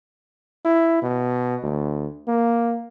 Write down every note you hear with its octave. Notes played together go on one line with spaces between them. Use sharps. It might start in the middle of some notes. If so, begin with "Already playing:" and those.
E4
B2
D2
A#3